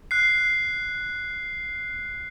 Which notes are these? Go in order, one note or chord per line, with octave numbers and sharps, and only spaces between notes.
F#6 C7